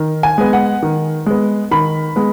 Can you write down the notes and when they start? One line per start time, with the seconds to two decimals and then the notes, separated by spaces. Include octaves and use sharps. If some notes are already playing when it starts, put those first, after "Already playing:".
Already playing: D#3
0.23 G#5
0.38 G#3 B3
0.53 F#5
0.82 D#3
1.26 G#3 B3
1.71 D#3 B5
2.16 G#3 B3